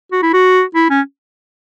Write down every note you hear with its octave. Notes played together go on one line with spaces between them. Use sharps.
F#4
E4
F#4
E4
C#4